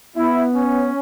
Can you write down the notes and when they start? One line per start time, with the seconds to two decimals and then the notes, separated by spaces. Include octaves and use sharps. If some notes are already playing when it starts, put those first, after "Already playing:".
0.16 B3 E4
0.55 C#4